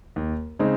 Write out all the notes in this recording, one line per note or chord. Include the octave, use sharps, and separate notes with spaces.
D#2
C#3 G#3 C4 D#4